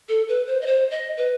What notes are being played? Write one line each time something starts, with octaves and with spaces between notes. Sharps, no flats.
A4
B4
C5
D#5
C5
D#5
B4